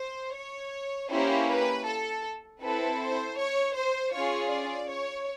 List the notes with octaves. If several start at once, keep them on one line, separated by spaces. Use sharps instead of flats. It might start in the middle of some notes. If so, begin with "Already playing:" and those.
Already playing: C5
C#5
A#3 C#4 E4 G4 C5
B4
A4
C4 E4 A4 B4
C5
C#5
C5
C#4 F4 G#4 C#5
D5
C#5